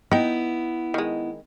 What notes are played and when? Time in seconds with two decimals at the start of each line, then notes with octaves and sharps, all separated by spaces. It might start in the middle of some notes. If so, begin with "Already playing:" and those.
0.11 B3 D#4 E4 G5
0.94 D#3 G#3